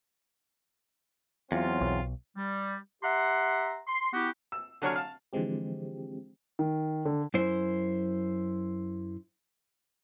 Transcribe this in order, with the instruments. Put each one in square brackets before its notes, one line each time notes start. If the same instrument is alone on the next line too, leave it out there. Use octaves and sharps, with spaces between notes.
[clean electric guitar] E2 [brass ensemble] F#3 C4 F4
[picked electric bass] B1
[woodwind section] G3
G4 E5 F#5 A#5 C6
C6
B3 E4 F#4 G4
[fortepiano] E6
D3 F#3 D4 C#5 G#5 F6
F5 A5
[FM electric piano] D3 E3 F3 G#3 C4 G4
[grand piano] D#3
D3
[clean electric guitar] F#2 E4 C5